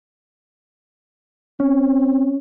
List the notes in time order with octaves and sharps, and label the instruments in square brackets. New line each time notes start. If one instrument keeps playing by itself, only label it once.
[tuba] C4 [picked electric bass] C#4